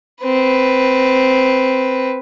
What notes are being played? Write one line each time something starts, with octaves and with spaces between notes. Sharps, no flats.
C4 B4